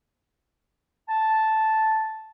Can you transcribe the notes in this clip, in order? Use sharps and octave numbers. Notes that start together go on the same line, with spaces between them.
A5